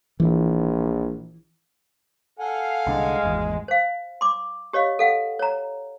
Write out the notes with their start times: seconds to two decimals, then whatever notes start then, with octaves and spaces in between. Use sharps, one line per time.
0.20 A#1 E3
2.39 A4 F5 F#5 G#5
2.87 C2 D3 G#3
3.23 G#1 E2 G#2
3.68 C5 F5
4.21 C6 D6
4.73 G4 C#5 D#5 F5
4.99 A4 F5 F#5
5.39 C#5 A#5